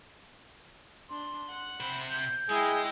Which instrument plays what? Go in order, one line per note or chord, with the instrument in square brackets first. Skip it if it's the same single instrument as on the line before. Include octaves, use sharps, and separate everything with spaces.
[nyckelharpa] D4 [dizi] C6
[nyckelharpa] F#5
[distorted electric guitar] C3 C5 [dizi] B5
[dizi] G6
[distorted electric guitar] G#3 [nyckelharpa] E4 G5 [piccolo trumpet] G#4